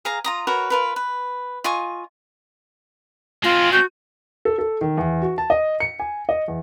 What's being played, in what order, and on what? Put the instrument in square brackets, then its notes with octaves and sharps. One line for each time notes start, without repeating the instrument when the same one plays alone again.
[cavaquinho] G#4 F5 A#5
F4 A#5 D#6
F#4 A#4 B4 C#5
F4 A#4 B4
B4
F4 D#5 G#5 C#6
[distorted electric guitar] G#3 C4 [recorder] F4
[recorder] F#4 [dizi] G6
[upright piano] A4
A4
D#3
E2
F#4
A5
D#5
C#7
G#5
D#5
E2